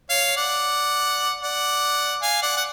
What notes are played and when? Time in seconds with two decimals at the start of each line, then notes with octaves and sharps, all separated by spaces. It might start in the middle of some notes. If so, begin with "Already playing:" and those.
0.10 C#5 F5
0.36 D5 F#5
1.42 D5 F#5
2.22 F5 G#5
2.42 D5 F#5
2.57 F#5